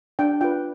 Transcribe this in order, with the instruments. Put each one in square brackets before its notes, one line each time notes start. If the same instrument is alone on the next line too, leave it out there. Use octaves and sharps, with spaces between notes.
[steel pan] D4 G5
F4 B4 G5